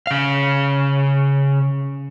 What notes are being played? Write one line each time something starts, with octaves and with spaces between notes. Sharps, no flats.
C#3 F5